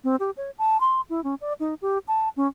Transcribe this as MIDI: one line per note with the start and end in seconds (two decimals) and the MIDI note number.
0.04 0.16 60
0.20 0.31 67
0.37 0.51 73
0.58 0.80 81
0.80 1.01 84
1.10 1.23 64
1.24 1.35 61
1.41 1.53 74
1.60 1.74 63
1.82 1.98 67
2.08 2.29 81
2.37 2.47 61